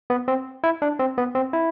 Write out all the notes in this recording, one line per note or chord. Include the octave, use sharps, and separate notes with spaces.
B3
C4
E4
D4
C4
B3
C4
E4